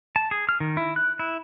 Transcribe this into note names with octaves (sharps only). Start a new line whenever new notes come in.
A5
G#4
F6
D#3
E4
F#6
E4